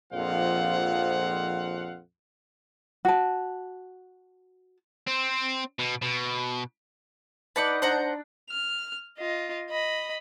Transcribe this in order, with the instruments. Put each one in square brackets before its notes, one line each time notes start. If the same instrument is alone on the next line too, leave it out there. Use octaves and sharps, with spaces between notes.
[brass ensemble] A#1 F2 F3 C4 F5 F#5
[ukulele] F#4 A5
[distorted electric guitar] C4
B2
B2
[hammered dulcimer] D#4 D5 A5 [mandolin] B4 F#5 D6
[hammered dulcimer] D4 [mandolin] C5 F#5 A#5
[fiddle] F6
F4 D#5
D#5 B5